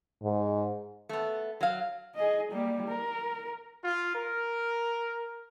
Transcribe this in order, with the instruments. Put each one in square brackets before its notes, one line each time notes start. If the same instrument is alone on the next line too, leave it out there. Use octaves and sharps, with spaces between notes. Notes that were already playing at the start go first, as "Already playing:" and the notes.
[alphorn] G#2
[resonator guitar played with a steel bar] A3 B3
F#3 F5
[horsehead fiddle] G#4 D#5
G3 A#3
A#4
[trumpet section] F4
A#4